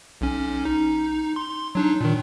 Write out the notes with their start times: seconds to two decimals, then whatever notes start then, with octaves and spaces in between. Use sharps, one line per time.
0.21 B1 C#4
0.65 D#4
1.36 C6
1.75 F#3 D4 D#4
2.01 A#2 D#3